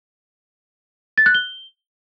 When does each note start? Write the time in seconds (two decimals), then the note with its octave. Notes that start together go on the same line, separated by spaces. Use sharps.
1.18 A6
1.26 F#6
1.35 G7